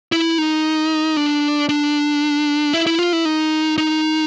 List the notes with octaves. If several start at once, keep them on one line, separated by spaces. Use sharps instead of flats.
E4
D#4
D4
D4
E4
E4
F4
E4
D#4
D#4